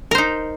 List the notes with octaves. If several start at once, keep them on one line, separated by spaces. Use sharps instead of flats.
D#4 A#4 C5